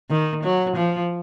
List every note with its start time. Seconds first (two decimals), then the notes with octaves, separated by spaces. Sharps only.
0.10 D#3
0.44 F#3
0.76 F3